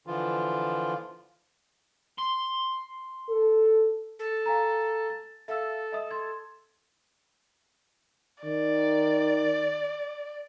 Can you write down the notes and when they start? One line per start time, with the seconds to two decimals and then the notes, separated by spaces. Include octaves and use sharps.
0.07 D3 E3 F3 F4
2.18 C6
3.29 A4
4.19 A4
4.46 F5 G#5 A#5
5.10 A6
5.48 A4 E5 F5 E6
5.92 D#5 E5 D#6
6.11 C6 G#6
8.44 D#3 D5